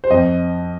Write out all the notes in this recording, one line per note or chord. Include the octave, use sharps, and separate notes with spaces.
C5
F2 D#5